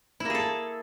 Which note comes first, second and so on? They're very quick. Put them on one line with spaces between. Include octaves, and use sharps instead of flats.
E4 A#3 G#4 A4